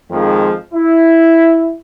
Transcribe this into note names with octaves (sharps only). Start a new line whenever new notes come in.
F2 D#3 F3 G#3
E4